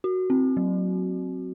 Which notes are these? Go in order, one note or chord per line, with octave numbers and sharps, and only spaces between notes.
F#4
C4
F#3